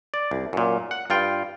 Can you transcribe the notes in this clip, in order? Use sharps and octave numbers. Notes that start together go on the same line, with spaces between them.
D5
C2
F#2 A#2
F#5
G2 F4 G5